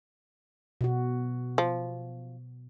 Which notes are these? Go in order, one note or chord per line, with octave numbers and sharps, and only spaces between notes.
B2 F#4
F3